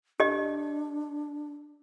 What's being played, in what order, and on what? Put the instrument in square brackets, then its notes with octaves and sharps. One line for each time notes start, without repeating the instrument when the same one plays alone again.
[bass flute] D4 [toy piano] G4 D#5